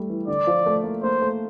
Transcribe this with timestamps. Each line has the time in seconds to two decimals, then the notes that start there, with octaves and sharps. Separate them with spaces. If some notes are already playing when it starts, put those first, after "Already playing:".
Already playing: G3 A3
0.10 E3
0.28 D3 D5
0.47 F3
0.66 A3
0.84 A#3
1.03 A#3 C5
1.22 A3